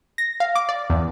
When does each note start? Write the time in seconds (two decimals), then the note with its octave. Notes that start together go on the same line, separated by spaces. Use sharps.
0.18 A#6
0.40 F5
0.55 D6
0.69 D5
0.90 E2